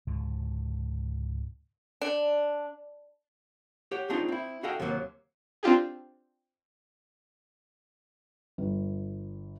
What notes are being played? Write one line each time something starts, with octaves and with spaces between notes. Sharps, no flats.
C#2 G#2 B2 D3
D4
G4 C#5 F#5
A3 C4 D4 D#4 F4 G#4
C4 E4
F#4 G#4 A4 D#5 F5 G5
D#2 C3 D#3 F#3 A#3
C4 D4 F4 G4 G#4
G1